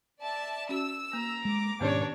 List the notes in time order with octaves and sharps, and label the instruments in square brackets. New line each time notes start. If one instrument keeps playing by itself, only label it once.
[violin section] D5 E5 A5
[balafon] C#4 F#4 [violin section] E6
[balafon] A#3 [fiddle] A#5
[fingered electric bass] G#3 [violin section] D6
[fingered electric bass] G#2 B2 D#3 [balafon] B3 C#4 G4 [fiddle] D4 C#5